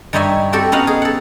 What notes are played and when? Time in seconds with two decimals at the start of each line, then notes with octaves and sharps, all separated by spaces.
0.13 G2 G3 D#4 C#5 E5 G#5
0.53 C4 F#4 G4 A4 F#5
0.72 B3 C#4 D#4 F5 F#5
0.87 G#4
1.02 A4 F#5